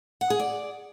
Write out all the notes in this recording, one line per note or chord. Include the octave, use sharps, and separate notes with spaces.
F#5
G#4
D5